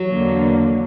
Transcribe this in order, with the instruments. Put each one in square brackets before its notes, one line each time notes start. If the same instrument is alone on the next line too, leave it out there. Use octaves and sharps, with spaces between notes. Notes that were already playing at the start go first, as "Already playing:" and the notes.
Already playing: [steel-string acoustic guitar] F#3
[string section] E2 D3 A#3